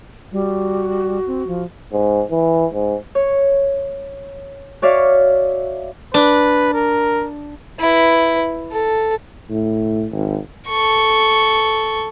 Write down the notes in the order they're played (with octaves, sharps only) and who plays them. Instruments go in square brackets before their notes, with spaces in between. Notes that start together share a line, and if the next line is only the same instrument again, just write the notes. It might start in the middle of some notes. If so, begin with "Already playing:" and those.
[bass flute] G3 [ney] F#4
[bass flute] C4
F3
[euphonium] G#2
E3
G#2
[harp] C#5
F#4 C#5 D5 E5 F5
[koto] D4 [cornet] B4
[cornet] A#4
[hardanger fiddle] E4 B4
A4
[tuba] A2
G#1
[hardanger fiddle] A4 C#6